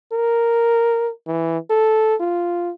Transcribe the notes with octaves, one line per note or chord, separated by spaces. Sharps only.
A#4
E3
A4
F4